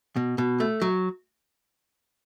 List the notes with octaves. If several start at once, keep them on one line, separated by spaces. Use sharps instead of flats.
B2
B2
A3
F#3